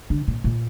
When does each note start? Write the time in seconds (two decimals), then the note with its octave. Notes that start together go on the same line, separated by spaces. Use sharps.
0.10 D3
0.28 A#2
0.44 A#2